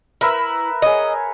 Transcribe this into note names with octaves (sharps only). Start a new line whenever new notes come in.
E4 A#4 B4 E5
G#4 C#5 D#5